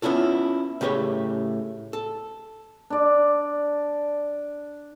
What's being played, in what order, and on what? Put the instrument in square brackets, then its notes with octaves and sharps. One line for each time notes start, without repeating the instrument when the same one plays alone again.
[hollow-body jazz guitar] B3 C#4 E4 F4 A4
A2 C#3 G4 B4 C#5
A4
[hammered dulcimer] D4 D5